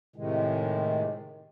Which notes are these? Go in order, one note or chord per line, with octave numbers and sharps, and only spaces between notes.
A2 C3 D#3 G#3